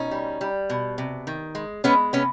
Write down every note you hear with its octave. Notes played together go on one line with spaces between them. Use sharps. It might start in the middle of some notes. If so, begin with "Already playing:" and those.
Already playing: B2 C#4 D#4
G3
G3
B2
C3
D#3
G#3
G#3 B3 C#4
C3 B3 C#4